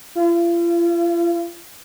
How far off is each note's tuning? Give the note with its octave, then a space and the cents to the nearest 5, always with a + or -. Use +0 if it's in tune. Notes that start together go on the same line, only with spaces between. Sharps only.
F4 -40